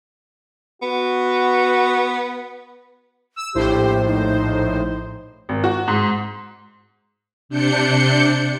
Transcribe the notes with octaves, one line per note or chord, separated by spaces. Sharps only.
B3 F#4
E6
A#1 A2 G4 C5
D#4
G#1
F#4
G#2
C3 D4 G6 C#7